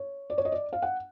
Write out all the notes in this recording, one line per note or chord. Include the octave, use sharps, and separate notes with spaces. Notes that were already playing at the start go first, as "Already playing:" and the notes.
Already playing: C#5
D5
C#5
D#5
D5
F5
F#5